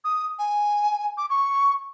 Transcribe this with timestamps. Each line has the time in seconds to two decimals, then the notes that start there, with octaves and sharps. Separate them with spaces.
0.04 D#6
0.38 G#5
1.17 D6
1.29 C#6